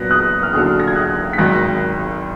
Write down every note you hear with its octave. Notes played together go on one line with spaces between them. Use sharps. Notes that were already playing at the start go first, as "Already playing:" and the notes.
Already playing: A#2 F#3 B3 D4 F#6 A#6
D#6 F#6
F6
D#2 D3 F#3 D#6 F#6
A#6
G#6
D#6 F#6
B6
G#1 G#2 D#3 F#3 F#6 A#6